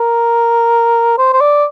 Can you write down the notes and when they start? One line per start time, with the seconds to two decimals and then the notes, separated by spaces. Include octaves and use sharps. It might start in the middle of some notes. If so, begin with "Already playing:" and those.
Already playing: A#4
1.18 C5
1.33 C5
1.41 D5